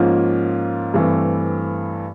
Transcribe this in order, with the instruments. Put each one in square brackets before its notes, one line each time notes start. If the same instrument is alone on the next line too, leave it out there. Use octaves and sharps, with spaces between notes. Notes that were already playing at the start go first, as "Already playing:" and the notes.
Already playing: [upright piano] G#2 F3 A#3 C#4 F4
G2 E3 A3 C4